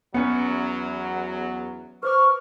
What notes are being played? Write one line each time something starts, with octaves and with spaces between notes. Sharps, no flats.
E2 F#3 B3 C#4 C#5 C#7
B4 C5 C#6 D6 F6